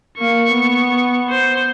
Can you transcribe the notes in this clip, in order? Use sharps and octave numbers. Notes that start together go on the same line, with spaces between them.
A#3 C#6
B3
C5